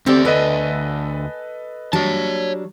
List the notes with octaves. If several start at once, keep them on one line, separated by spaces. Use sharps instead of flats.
D2 C4 G4 A4 D5
A4 B4 D#5 G#5
F#3 G3 D4 C#5 A5